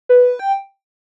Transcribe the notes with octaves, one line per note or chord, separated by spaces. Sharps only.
B4
G5